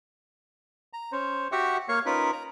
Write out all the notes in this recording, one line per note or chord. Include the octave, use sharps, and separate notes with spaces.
A#5
C#4 C5
F#4 G4 E5 F#5
A#3 C#5 F5 C#6
C#4 D#4 F4 A#4 B4
A#5